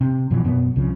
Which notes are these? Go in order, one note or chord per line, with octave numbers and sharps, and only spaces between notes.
C3
F#2 B2 E3 F3
F#2 B2 B3
C2 C#3 F3